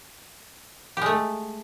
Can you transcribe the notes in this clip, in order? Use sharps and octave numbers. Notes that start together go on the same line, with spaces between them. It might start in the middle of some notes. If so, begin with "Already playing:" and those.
G#3 A3 G4